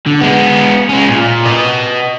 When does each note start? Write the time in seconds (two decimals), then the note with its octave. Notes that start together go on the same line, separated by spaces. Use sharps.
0.06 D3
0.21 G#3 B3
0.89 G#3 C#4
1.09 A#2
1.46 B4 D#5